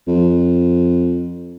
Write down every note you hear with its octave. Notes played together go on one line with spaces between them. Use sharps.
F2